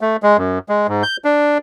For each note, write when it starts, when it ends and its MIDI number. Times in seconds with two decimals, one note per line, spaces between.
0.01 0.17 57
0.23 0.37 56
0.37 0.59 42
0.69 0.87 56
0.88 1.03 44
1.03 1.17 91
1.25 1.58 62